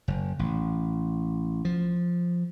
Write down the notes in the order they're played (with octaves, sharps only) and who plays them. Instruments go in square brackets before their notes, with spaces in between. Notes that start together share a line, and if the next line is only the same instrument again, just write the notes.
[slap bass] F#1
A1
F3